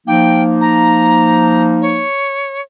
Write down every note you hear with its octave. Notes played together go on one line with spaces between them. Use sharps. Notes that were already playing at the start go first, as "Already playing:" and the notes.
F3 A#3 D#4 G5
A#5
C#5